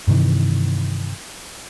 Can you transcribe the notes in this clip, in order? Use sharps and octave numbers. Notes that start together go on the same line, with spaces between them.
G2 C3 D#3 E3